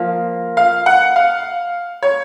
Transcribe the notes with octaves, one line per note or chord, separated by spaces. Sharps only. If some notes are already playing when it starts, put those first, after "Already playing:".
Already playing: F3 A#3
F5
F#5
F5
C#5